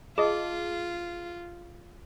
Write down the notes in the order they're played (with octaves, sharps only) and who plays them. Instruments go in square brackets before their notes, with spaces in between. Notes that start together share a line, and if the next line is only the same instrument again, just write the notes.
[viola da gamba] F4 [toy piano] G#4 [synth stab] D#5 A5